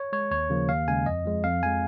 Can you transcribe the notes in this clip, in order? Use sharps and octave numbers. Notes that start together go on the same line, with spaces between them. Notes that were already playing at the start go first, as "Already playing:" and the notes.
Already playing: C#5
G#3 C#5
D#2 C#5
C#3 F3 A#3
D#2 F5
C#3 G#3 G#5
F2 D#5
F3 G#3
F2 F5
F3 G#3 G#5